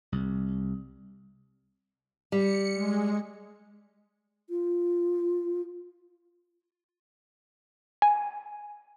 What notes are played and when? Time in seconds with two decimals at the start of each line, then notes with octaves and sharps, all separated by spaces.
0.12 C2
2.32 G3 C#7
2.73 G#3
4.50 F4
8.02 G#5